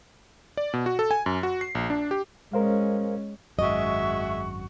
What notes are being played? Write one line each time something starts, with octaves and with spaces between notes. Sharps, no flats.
D5
B2
F#4
A4
G#5
F#2
F#4
C7
A#1
D4
G4
G#3 C#4 A#4 C5 F5
G#1 F#2 G#3 F#4 D#5 E5 C#6